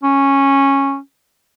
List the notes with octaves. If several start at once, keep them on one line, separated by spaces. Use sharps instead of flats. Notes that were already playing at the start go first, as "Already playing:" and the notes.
C#4